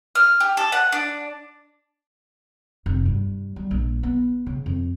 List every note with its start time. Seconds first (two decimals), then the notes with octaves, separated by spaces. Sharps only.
0.15 F6
0.40 G4
0.57 A4
0.72 F#5
0.92 D4
2.86 F1
3.06 G2
3.56 G3
3.71 A#1
4.03 B3
4.46 C#3
4.66 F2